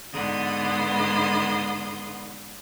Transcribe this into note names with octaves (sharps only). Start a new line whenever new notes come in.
G#2 D3 B3 C6 D#6